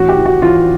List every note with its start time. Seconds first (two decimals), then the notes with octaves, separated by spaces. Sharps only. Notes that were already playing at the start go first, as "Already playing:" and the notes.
Already playing: A1 F#4
0.09 G4
0.17 E3
0.26 F#4
0.42 E3 F4